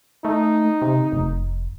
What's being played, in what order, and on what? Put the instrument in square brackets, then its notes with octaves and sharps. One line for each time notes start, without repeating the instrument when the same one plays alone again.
[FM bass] A3 [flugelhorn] D#4
[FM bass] C3
F1